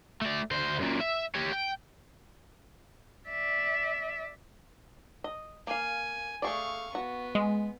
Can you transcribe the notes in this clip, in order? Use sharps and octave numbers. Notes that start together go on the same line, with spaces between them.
A3 D5
D2 C5
F#2 A#2
E5
G4 C#5
G5
D5 E5
D#5
A#3 F5 G#5
A3 G#4 D5 F5 C#6
B3 F#4
G#3